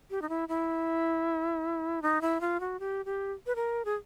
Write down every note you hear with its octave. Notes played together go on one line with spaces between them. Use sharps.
G4
D#4
E4
E4
D#4
E4
F4
F#4
G4
G4
B4
A#4
G#4